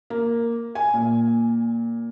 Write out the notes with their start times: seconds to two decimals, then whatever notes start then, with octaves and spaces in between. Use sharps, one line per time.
0.10 A#3
0.75 G#5
0.94 A#2